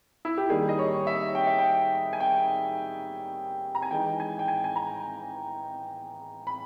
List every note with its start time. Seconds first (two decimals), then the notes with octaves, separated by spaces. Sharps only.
0.25 E4
0.38 G4
0.50 D#3 G3 A#3 D#4 G#4
0.69 D#5
0.79 C#5
1.07 E5
1.35 G5
1.47 E5
1.59 G5
2.13 G#5
2.20 G5
3.75 A#5
3.82 G#5
3.91 E3 G#3 D#4 G5
4.20 G#5
4.39 G5
4.48 G#5
4.64 G#5
4.76 A#5
6.47 B5